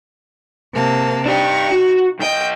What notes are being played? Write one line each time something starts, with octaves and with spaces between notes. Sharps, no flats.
C3 A#3 A5
D4 D#4 G4 C#6
F#4
B1 D#5 G5 G6